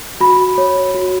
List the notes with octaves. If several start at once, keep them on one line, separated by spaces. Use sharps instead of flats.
F#4 B5
C#5
F#4